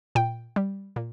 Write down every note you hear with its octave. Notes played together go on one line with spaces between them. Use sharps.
A#2 G5
G3
A#2